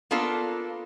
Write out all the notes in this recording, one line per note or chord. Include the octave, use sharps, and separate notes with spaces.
A#3 B3 D4 F4 A4